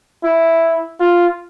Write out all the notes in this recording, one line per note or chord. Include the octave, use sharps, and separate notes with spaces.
E4
F4